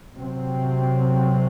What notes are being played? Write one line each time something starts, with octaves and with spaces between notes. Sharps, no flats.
C3 F#3 C4